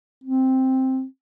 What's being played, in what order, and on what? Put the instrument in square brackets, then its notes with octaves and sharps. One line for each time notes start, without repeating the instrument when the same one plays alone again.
[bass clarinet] C4